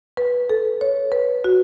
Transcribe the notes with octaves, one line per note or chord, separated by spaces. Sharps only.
B4
A4
C#5
B4
F#4